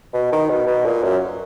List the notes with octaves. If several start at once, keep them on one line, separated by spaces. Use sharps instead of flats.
B2
D#3
B2
B2
A#2
F#2